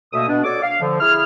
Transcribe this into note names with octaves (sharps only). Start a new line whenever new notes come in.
D2 B2 A3 A#3 E5 D#6
B2 B3 D4
F#4 A4 C#5 D5 D6
F5
D3 F3
E4 G#4 F6